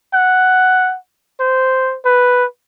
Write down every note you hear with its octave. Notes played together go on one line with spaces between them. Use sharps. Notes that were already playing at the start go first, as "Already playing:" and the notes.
F#5
C5
B4